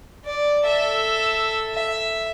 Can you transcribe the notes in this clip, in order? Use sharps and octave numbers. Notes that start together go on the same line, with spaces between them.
D5
A4 E5
E5